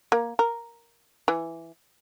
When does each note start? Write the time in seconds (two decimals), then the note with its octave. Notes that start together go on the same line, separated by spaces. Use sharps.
0.12 A#3
0.39 A#4
1.28 E3